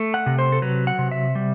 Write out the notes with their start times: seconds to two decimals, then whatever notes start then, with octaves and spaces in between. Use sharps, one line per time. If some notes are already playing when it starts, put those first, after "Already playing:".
Already playing: A3
0.14 F#5
0.26 C3
0.39 C5
0.52 A4
0.62 F#3 B4
0.87 F#5
0.99 C3
1.11 E5
1.35 G3